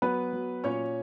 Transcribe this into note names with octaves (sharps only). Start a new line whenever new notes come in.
F#3 B3 B4
F#3
A#2 C#4 C#5